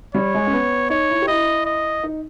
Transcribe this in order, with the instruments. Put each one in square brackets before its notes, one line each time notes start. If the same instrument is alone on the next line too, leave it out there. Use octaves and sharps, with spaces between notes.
[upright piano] G3 [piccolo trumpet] C#5
[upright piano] G#3
C#4
B3
[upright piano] D#4 [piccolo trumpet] C#5
[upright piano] E4
G4
[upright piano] E4 [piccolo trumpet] D#5
[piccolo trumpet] D#5
[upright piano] D#4